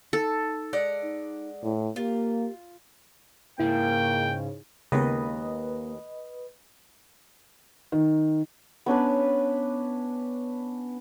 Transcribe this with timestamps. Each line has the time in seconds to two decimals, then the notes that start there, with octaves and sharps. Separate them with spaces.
0.13 D#4 A4
0.73 G#3 D5 F#5
1.02 D#4
1.63 A2 E4
1.96 A#3 F4 G4
3.59 G#2 C#3 A#3 E4 G5
4.92 D#2 C#3 G#3 A#3 B3 B4 D#5
7.92 D#3
8.86 B3 C#4 D4 B4